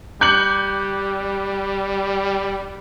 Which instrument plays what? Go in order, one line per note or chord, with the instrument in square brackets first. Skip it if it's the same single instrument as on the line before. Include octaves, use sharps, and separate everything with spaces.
[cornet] G3 [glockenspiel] D6 F#6 [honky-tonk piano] G6 C#7 F#7